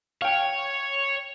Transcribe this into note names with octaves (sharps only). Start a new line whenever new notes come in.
C#5 F5 G5